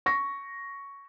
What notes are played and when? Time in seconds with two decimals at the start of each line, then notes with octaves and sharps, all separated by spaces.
0.06 C#6 A#6